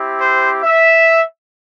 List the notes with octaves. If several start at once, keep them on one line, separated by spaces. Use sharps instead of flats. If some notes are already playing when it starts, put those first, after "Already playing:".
Already playing: C4 E4 G4
C5
E5